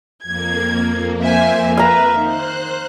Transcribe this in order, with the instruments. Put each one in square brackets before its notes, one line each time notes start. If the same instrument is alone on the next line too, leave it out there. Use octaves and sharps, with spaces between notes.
[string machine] F2 A#3 [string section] G#6
[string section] C5 E5 G#5
[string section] B4 E5 [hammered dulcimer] F5 A#5
[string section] D#3 [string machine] C5 F#6